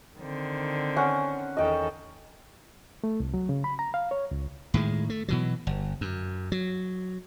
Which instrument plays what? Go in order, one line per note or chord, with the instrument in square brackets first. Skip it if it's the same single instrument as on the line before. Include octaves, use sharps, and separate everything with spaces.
[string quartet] D3 D#3 C4
[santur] C#4 F#5
[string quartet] E2 D#3 A4 [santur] D#5 G5
[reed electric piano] A3
C2
F#3
C#3
B5
A#5
F5
C#5
C#2
[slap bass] A2 D#3 G#3
A3
B2 E3 F#3
G1
F#2
F#3